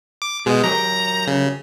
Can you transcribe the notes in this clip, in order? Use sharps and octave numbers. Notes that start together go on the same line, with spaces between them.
D6
B2 G#3 G#4
F#3 G4 A#4 A#5
C#3